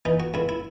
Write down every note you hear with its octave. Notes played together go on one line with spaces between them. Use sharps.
E3 D#4
F#4
C#2 E4
E4